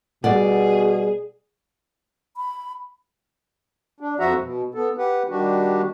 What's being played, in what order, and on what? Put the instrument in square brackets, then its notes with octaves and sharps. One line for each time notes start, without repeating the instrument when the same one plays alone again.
[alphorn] B2 [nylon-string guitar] G3 D5 F#5 [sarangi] G#4
[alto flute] B5
[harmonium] D4
F2 F3 F#4 E5 F#5 A#5
B2
B3 A4
G4 B4 F#5
D#3 G3 D4 F#4 G4